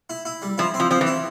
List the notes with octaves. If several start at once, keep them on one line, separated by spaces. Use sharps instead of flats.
E4
E4
G3
F3 E4
C4
F3
F3 C4
E3
E4